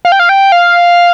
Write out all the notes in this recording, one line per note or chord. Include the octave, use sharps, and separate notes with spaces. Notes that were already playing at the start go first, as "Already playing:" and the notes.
F5
G5
F5
G5
F5